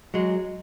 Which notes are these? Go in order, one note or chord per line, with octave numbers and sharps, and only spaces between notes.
F#3 G#3